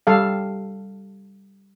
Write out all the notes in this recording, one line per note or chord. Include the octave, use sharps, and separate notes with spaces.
G3 A4 F5